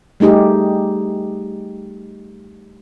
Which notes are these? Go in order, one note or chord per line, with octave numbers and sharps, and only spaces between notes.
G3 A3 D#4 G4 G#4